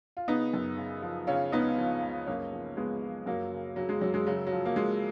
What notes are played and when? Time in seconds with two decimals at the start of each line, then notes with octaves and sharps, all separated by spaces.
0.17 F4
0.28 C#3 B3 D#4
0.53 F#2
0.77 C#3
1.02 F3
1.27 C#3 C#4 F4
1.52 C#2 B3 D#4
1.78 F3
2.02 C#2
2.27 F#2 A#3 C#4
2.52 F3
2.77 F3 G#3 B3
3.02 F3
3.26 F#2 F#3 A#3
3.51 C#3
3.76 C#3 F#3
3.89 G#3
4.01 F#2 F#3
4.14 G#3
4.26 C#3 F#3
4.46 F3 F#3
4.65 A#3
4.76 F3 G#3